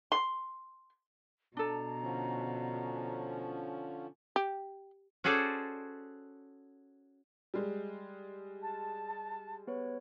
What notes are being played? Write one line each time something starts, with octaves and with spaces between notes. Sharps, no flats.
C6
B2 D4 A4 A#5
D3 F3 C#4
G4
C#4 F#4 G#4 A4 C5 D5
G3 G#3
A5
B3 B4 C#5